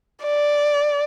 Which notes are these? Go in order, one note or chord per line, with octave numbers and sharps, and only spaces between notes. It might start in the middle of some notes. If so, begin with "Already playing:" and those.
D5